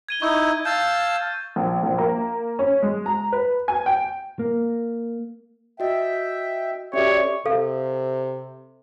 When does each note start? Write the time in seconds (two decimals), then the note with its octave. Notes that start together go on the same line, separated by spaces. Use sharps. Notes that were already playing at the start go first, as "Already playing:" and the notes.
0.09 G#6 D#7 G7
0.22 D#4 E4 C#6 G6 G7
0.65 F5 A5 E6 G6 A6
1.56 A#1
1.83 A#1
1.98 A#3
2.59 C#4
2.82 G#3
3.06 A#5
3.32 B4
3.68 G#5
3.86 G5
4.39 A#3
5.80 F#4 D#5 E5 G5
6.93 C#4 F#4 G4 A4 C#5 D5 E5
7.46 C3 A4 F5